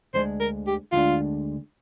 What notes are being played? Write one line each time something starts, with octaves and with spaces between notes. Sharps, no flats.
D2 D3 G#3 D4 C5
A#4
G4
D2 D3 G#3 D4 F4